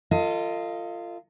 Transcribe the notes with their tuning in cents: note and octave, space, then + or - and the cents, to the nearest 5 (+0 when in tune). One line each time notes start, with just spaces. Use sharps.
F4 -10 A4 +40 D#5 +15